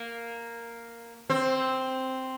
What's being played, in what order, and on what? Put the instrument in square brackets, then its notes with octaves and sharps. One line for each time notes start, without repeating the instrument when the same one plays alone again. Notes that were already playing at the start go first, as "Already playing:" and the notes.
Already playing: [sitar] A#3
C4